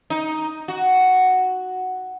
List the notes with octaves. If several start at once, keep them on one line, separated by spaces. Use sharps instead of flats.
D#4
F#4